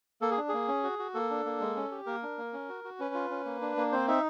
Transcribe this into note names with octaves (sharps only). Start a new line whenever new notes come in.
A#3 A4
G#4
D4
A#3 G#4
C#4
F#4
F#4
A#3 A4
D4
A#3
G#3
C#4
G4
A#3 A#4
D4
A#3
C#4
F#4
F#4
C#4 B4
F4
C#4
A#3
D4
A#3
C4 C5
D#4 E5